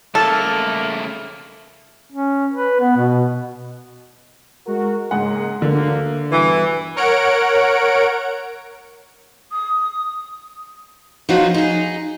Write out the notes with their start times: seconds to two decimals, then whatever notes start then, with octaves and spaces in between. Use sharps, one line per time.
0.15 C#3 A3 A#3 A4 A5
2.12 C#4
2.53 B4
2.80 B3
2.96 B2
4.66 G#3 F#4 A#4
5.11 G#2 C#3 G#3 A#3 F#5
5.62 D2 D3 A#3
6.32 G2 B2 E3
6.96 A#4 C#5 F#5 D7
9.52 D#6
11.29 F3 F#3 B3 D#4 F4 F#4
11.54 D#4 G#4